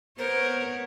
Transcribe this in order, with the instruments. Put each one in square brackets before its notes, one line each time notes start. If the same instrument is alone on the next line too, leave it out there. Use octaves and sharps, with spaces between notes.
[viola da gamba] B3 C#5 [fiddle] A#4 [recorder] C5